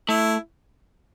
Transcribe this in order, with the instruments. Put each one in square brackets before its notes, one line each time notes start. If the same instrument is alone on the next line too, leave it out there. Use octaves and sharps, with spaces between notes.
[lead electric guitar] A3 [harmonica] E4